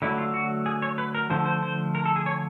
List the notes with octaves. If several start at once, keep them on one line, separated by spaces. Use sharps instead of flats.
D3 F#3 A3 E4
F4
F#4
G#4
C#5
B4
A#4
D3 F3 A3 C5
C5
C5
A#4
A4
G#4
C#5